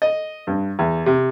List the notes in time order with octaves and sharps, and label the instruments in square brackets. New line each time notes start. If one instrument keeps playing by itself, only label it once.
[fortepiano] D#5
G2
E2
C3